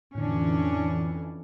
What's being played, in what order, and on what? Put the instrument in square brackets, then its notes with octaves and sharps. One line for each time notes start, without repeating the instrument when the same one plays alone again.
[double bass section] F2 E3 [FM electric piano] A2 D3 [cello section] C#4 D4